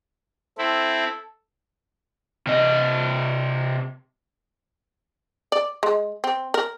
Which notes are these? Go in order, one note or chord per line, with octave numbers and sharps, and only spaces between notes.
C4 E4 A4
C3 D#5
D5
G#3
C4
A#4